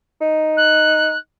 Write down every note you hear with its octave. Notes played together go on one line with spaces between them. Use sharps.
D#4
F#6